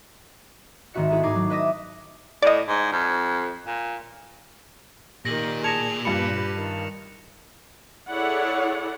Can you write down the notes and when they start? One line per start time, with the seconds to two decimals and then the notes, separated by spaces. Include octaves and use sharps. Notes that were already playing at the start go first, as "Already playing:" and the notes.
0.94 G#1 D#3 C4 F#4 E5 C#7
1.10 B3 E4 G#4 A4
1.23 G#2 A3 D#4 D6 G#6 C7
1.35 F#3
1.50 B4 D#5 E5 D6 D#6 A#6
2.42 A2 D5 D#5
2.68 G#2
2.93 F2
3.67 A#2
5.25 A#2 D#3 G4 A#6 F#7
5.64 G#4 A5 G#6 A#6 C#7 E7 F7
6.05 G2 F4 G4 B4 B5 C#7
6.55 D#3
8.09 E4 G#4 A4 C#5 D5 F#5